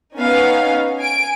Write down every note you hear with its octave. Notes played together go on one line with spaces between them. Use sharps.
B3 C#4 D#4 F5
G#5 D7